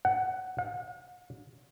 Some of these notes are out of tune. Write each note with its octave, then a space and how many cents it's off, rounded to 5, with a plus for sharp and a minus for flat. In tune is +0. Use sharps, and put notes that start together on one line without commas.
F#5 +10
F#5 -45